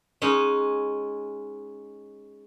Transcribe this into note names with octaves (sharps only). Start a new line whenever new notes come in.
G#3 C#4 D#4